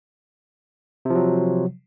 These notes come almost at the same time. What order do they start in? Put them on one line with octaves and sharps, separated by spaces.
C3 F3 F#3